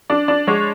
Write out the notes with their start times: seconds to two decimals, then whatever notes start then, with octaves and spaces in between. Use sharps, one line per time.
0.10 D4 D5
0.28 D4 D5
0.47 G#3 C#5